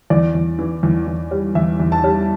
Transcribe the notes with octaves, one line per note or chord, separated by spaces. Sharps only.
E2 D5
E2
E3
E2
E2
G3
E2 E5
E2
A5
G3